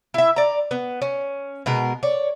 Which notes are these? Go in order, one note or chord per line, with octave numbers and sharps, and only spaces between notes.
E4 E5
D5 A#5
B3
C#4
B2 G#3 A#4
C#5 D5